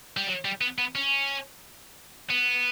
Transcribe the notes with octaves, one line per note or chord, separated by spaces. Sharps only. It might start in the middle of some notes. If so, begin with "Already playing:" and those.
G3
F#3
G3
B3
B3
C#4
B3